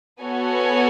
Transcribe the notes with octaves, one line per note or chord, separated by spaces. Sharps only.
B3 F#4 A4 C#5 G#5